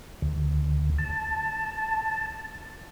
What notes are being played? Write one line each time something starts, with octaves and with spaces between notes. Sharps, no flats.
D2
A5